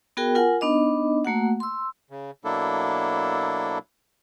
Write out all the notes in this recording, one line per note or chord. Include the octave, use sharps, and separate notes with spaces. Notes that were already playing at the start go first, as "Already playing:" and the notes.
B3 F#4 G#4 A#4 G5
F4 A#4 F#5 G#5
B3 D4 D#4 D#5
A3 A#3 F#4 F#5
C6 E6
C#3
B2 F#3 A#3 D4 E4 A4